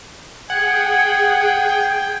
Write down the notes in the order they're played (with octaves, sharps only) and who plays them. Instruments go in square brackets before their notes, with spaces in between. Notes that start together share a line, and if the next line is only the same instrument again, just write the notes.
[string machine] G#4 [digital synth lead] F#5 [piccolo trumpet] G5 [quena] G#6